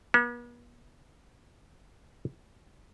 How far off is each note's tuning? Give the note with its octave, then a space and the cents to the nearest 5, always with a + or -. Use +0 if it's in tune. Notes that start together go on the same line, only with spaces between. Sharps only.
B3 -45